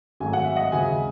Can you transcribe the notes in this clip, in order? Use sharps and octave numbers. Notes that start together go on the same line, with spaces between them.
G#1 G#2 F#3 A3 G#5
F#5
E5
D#5 F#5
D#2 C#3 G#3 C4 E5 G#5